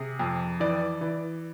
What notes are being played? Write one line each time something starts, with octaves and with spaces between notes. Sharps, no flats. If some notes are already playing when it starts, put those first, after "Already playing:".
Already playing: C3 G#4
F2
E3 D5
E3